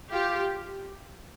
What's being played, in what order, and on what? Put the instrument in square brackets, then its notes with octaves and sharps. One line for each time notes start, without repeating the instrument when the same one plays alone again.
[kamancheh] F4 [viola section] G4